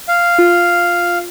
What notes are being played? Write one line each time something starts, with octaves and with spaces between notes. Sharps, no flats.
F5
F4